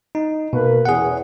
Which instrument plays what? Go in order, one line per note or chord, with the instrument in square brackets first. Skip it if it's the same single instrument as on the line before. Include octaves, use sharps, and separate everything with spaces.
[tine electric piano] D#4
[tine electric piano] B2 [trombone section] A#3 A#4 B4
[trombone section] E2 C#4 [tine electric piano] G#4 F#5